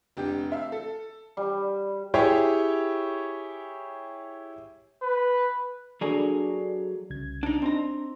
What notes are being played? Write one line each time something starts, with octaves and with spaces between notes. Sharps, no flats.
F1 D4 G4
E5 F5
A4
G3
E4 G4 G#4 C#5 G5
B4
F#3 A#3 D4 G#4 A4 D5
C2 C#3 G#6
D4 D#4
C4 D4 D#4 A5 A#5